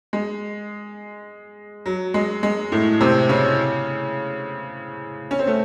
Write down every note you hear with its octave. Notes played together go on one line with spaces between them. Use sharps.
G#3
F#3
G#3
G#3
A2 A3
C3 C4
C#3 C#4
C#4
C4
A3